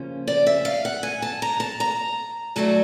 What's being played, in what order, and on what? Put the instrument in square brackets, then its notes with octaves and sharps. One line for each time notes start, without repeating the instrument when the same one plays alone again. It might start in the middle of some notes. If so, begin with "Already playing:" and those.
Already playing: [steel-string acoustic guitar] C#3 F3 A#3 C#4
D5
E5
F5
F#5
G#5
A5
A#5
A5
A#5
A2 F#3 A3 D4 A5